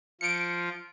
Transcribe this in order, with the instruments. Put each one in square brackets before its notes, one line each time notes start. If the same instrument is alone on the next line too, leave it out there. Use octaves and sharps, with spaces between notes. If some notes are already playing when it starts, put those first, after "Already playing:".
[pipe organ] F3 F4 [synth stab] C#7 D7